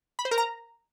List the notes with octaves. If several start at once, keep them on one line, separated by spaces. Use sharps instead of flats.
B5
C5
A#4
A#5